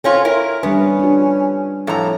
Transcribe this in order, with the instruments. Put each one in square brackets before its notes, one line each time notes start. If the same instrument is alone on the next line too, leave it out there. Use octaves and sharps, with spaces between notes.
[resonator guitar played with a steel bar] C4 C#4 F4 [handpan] A4 C#5
[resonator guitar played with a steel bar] E4 A#4
[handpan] G3 D4 B4 [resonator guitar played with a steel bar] B3 [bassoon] C#4
[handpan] D4 F4
[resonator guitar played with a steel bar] F2 A#5 [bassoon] A2